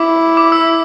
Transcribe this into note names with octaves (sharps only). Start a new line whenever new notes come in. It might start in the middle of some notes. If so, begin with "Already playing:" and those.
Already playing: E4 D6
D6
E6